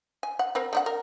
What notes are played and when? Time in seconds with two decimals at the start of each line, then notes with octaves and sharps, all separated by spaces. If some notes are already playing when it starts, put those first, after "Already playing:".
0.23 G#5
0.39 F#5
0.55 C4 A#4 B4
0.73 A3 D4 F#5
0.86 A#4